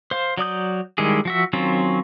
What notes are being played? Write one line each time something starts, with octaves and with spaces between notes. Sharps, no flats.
C5 F5
F#3 D5 D#6 G6
D#3 G3 G#3 E4 G#4
F3 F#4 E5
D#3 F#3 C4 C#4 F4